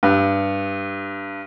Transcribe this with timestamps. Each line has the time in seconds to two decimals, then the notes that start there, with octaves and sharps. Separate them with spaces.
0.03 G2